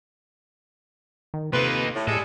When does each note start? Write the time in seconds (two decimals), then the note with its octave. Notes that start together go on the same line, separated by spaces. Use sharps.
1.34 D#3
1.53 C3 A#3 D#4 F4 A4 B4
1.95 A2
2.07 A2 G3 G#3 A4